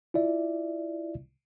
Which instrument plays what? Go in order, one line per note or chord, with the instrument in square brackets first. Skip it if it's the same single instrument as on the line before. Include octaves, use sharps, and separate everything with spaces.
[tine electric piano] E4 F4 D5 E5